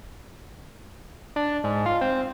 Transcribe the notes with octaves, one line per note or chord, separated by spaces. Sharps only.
D4
G#2
F4
C4